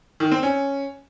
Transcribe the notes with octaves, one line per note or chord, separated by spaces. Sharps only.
D#3
C4
C#4